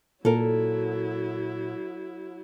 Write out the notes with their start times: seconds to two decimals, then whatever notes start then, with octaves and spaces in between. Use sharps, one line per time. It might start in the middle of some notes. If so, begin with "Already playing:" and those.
0.25 A#2 F#3 E4 A4 A#4